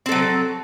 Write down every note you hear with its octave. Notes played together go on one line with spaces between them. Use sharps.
F#3 C4 A4